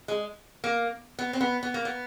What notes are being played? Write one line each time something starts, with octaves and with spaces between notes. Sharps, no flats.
G#3
A#3
B3
C4
B3
B3
A#3
B3